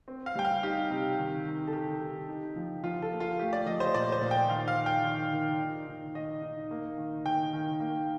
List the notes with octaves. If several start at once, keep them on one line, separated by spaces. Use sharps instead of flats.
C4
F5
G3 G5
F5
D#4 G4
C3
D#3
D#3
A4
D#3 G4
D#3
D#4
F3
F3 F4
A4
A#3
F4
A3 G4
D5
F3 D#5
C5
A#2 D5
C5
A#2
G5
D#3 F5
F5
D#3
G5
D#3
D#3
D#4
D#3
D#3 D#5
D#4
A#3
D#3
D#3 G5
D#3
A#3